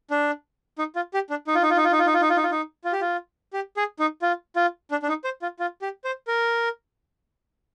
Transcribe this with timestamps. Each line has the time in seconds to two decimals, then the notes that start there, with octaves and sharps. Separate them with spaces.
0.10 D4
0.78 D#4
0.96 F4
1.14 G4
1.30 D4
1.47 D#4
1.55 F4
1.62 D#4
1.70 F4
1.77 D#4
1.85 F4
1.92 D#4
1.99 F4
2.06 D#4
2.14 F4
2.21 D#4
2.29 F4
2.37 D#4
2.43 F4
2.51 D#4
2.84 F4
2.93 G4
3.01 F4
3.53 G4
3.77 G#4
3.99 D#4
4.22 F4
4.56 F4
4.91 D4
5.02 D4
5.08 D#4
5.24 C5
5.42 F4
5.59 F4
5.82 G4
6.04 C5
6.28 A#4